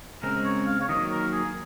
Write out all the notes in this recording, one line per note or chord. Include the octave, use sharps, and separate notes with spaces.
C#3 G#3 C4 A#4
C#5
F5
C#5
D#3 F#3 A#3 D#5
A#4
G#4